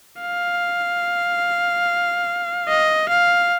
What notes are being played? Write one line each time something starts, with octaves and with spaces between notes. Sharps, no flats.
F5
D#5
F5